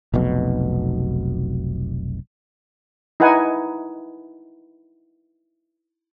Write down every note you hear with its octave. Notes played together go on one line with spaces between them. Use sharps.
F1 B1 B2
D#4 E4 B4 F#5 G#5